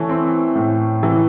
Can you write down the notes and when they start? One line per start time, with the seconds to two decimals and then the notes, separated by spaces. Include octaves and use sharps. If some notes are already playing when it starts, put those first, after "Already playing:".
Already playing: E3 A3 C#4
0.09 C4
0.55 A2
1.03 E3